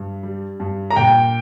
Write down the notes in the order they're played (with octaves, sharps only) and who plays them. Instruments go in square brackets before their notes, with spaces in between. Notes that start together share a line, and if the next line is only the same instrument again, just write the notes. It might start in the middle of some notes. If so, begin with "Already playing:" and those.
Already playing: [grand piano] G2
G3
G2
[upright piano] A#5
[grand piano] A#2 [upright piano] G5